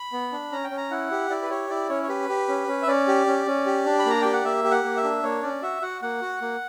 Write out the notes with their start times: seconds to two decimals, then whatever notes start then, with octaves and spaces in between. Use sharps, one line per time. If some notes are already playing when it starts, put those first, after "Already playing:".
Already playing: B5
0.13 B3
0.32 D4
0.52 C#4 A#5
0.64 G5
0.71 C#4
0.77 A#5
0.91 E4 F#5
1.11 G4
1.30 E4 D5
1.42 B4
1.50 G4 C#5
1.70 E4 D5
1.89 C#4 C#5
2.03 C#5
2.09 G4 B4
2.29 G4
2.48 C#4
2.68 C#4
2.82 E5
2.87 C#4 D5
3.08 G4
3.27 C#4
3.47 C#4
3.66 G4
3.86 D4
3.99 B5
4.06 A#3 A#5
4.22 G4 G5
4.33 F#5
4.45 A#3 E5
4.64 G4
4.71 F#5
4.84 A#3
4.97 E5
5.04 D4
5.23 A#3 C#5
5.43 C#4 D5
5.62 F#4 E5
5.82 F#4 F#5
6.02 A#3 F#5
6.21 F#4
6.41 A#3